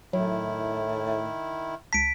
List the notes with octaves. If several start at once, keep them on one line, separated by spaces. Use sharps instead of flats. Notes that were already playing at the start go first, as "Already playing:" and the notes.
A2 D#3 F#3 E4
C#2 A5 B6 D7